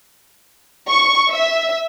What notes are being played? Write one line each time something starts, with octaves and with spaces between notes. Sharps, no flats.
C#6
E5